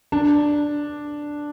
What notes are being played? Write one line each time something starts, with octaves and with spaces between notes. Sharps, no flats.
D4